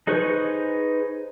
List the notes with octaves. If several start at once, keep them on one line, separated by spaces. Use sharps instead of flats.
D#4 G#4 B4 C5 C#6